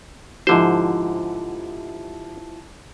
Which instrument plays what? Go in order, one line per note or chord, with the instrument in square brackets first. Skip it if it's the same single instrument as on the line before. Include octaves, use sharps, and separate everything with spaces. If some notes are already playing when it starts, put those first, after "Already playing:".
[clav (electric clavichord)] G#2 D3 C5 [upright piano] F3 E4 G4